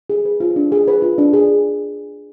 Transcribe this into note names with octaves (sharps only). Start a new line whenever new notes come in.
G#4
B4
F4
D4
G#4
B4
F4
D4
G#4